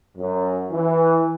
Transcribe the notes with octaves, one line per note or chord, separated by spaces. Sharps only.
F#2
E3